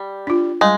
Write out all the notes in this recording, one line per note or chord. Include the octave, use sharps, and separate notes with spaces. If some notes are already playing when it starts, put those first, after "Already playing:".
Already playing: G3
D4 F4
G3 G#3